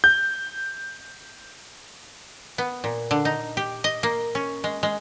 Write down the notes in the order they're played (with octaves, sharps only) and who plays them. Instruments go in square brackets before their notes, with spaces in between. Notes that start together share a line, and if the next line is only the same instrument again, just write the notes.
[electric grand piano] G6
[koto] B3
A#2
D3
D#4
G4
D#5
A#3
C#4
G#3
G#3